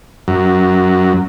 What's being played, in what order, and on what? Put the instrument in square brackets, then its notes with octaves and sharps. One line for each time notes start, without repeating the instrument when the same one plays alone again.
[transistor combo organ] F#2